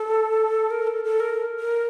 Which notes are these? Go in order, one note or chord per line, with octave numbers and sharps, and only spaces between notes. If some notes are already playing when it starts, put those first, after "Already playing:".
Already playing: A4
A#4
A4
A4
A#4
A#4